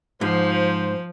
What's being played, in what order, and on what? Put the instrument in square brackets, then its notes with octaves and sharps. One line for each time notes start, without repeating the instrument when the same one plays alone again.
[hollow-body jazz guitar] G#2 [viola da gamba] F3 [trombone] C5